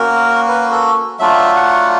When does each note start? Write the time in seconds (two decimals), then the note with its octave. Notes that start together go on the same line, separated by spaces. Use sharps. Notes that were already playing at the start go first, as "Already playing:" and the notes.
Already playing: A#3 C#4 F#4 A#4
0.48 B4
0.72 A4
1.20 F#3 A3 D4 F4 E5
1.56 F#5